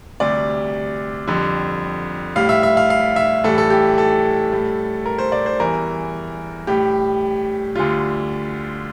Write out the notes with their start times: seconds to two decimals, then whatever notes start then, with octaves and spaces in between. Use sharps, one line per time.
0.20 D2 C3 G3 D5
1.28 F2 D3 G3
2.36 A2 G3 F5
2.49 E5
2.63 E5
2.77 F5
2.90 F5
3.16 E5
3.44 A2 E3 G3 A4
3.58 A4
3.70 G4
3.98 A4
4.52 A2 G3
5.06 A#4
5.18 C5
5.32 D5
5.46 C5
5.59 E2 E3 G3 A#4
6.67 A2 G3 G4
7.75 D2 D3 G3 F4